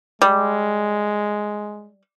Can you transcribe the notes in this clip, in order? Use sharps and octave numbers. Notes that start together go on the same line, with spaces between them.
G3 G#3